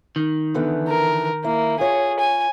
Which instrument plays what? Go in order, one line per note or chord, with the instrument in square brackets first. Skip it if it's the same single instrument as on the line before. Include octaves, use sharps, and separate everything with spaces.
[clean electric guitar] D#3
[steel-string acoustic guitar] D3 E3 B3
[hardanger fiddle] A#4
[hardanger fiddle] A#3 [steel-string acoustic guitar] E4
[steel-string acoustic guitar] F4 C#5 [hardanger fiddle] G#4
[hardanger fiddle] G#5